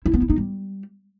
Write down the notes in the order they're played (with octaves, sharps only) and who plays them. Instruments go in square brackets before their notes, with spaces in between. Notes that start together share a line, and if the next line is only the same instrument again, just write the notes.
[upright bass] E4
B3
E4
D#4
G3